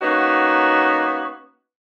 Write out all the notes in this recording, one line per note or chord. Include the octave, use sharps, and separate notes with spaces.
A#3 B3 C#4 D#4 F#4